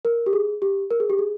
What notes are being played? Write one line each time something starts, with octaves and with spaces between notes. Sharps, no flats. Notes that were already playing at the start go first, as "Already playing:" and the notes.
A#4
G4
G#4
G4
A#4
G#4
G4
G#4